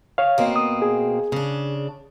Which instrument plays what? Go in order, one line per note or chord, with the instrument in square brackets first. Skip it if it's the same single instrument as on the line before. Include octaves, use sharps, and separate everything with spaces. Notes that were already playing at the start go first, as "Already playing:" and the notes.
[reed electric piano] C#5 F5
[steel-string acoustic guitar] B2 A#3 C4
[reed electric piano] D#6
G#4
[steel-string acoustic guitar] C#3 D4